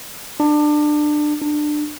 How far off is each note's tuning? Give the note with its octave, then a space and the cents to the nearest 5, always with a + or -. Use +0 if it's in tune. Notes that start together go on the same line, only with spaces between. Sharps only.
D4 +25
D4 +25